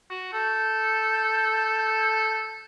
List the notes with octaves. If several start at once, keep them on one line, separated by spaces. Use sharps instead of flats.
F#4
A4 G6